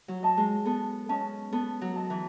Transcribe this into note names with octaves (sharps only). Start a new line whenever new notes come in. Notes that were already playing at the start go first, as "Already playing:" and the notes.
F#3
D#5 A5
G#3
B3 A4
C#4 D#5 A5
B3 A4
F#3
D#5 A5
E3